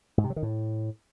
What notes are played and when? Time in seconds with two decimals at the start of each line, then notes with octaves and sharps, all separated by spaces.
0.18 G#2
0.24 C3
0.30 F#3
0.36 D#3
0.43 A2